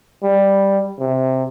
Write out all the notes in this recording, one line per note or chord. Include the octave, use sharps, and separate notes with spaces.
G3
C3